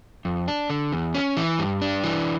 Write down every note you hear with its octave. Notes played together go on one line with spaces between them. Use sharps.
F2
D4
D3
E2
C#4
E3
G2
D4
E3